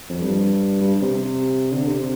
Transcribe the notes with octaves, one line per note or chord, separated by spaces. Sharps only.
F2
G2
G2
C3
D3
C3